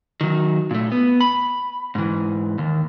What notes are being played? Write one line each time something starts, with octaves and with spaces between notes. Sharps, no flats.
D#3 F#3
A#2 A3
B3
B5
G#2 E3
D#2